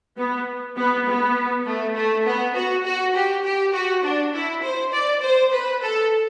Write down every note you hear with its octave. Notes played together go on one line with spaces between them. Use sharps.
B3
B3
B3
A3
A3
B3
F#4
F#4
G4
G4
F#4
D4
E4
C5
D5
C5
B4
A4